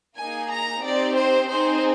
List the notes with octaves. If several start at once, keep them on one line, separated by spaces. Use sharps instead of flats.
A#3 D#4 G#4 G#5
A#5
C4 D#4 G4 D5
C5
C4 D#4 G#4 C5